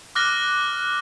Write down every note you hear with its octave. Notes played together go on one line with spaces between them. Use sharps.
D6 F6 F#6 A#6 G7